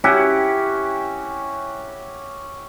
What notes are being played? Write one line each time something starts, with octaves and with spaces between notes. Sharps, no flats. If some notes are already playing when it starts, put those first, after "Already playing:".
C#4 E4 F#4 G4